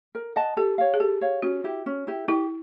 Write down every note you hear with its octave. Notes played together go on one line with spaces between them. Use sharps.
A#4
D#5 F#5 A5
G4 A4
C#5 F5
G#4
G4 A4
C#5 F5
C#4 F#4
E4 G4
C#4
E4 G4
E4 G4